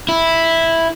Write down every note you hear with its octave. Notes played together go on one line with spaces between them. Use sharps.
E4